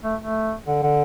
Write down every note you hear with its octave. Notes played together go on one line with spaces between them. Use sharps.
A3
A3
D3
D3